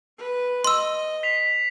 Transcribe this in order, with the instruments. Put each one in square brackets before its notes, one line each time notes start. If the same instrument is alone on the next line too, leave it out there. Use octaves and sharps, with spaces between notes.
[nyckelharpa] B4
[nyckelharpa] D#5 [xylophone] C6 E6
[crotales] B6 C7 F7